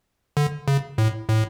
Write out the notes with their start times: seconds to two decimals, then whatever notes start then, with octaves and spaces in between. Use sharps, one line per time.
0.37 D3
0.68 C#3
0.98 A2
1.29 A2